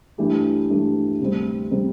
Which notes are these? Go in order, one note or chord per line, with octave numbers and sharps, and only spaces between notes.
G2 E3 A3 D4 G4
G2 E3 A3 D4 G4
D2 C3 G3 C4
C3 G3 C4